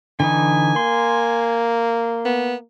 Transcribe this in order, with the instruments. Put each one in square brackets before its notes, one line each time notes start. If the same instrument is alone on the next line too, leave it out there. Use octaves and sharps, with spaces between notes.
[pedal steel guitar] D3 E3 D#4 [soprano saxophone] G#5
[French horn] A#3 [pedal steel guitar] C6
[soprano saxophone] B3